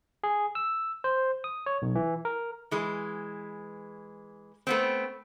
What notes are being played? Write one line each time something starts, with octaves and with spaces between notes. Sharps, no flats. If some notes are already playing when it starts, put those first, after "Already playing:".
G#4
E6
C5
D#6
C#5
B1
E3
A#4
E3 G#3
A3 B3 C4